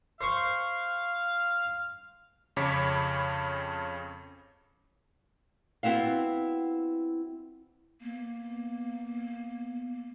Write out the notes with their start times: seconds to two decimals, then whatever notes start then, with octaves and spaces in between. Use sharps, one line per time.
0.21 C5 F5 C#6
2.57 F2 C#3 C#5 B5 D6 B6
5.83 B3 C4 E4 F#4 F5
8.01 A#3 B3